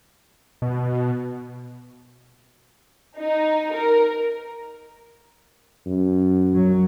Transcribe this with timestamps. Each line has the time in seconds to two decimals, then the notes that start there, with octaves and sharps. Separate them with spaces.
0.62 B2
3.18 D#4
3.75 A#4
5.86 F#2
6.54 F#3